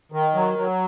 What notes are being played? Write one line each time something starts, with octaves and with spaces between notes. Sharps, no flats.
D#3
F#3
F#3